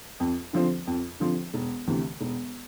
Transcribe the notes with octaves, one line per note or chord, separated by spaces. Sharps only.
F2
D3 F3 C4
F2
D3 F3 C4
E1
D2 C3 E3
E1